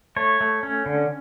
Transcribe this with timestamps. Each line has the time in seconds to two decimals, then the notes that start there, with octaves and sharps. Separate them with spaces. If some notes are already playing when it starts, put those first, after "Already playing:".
0.16 A3 C#5
0.41 A3
0.63 C#4
0.86 D3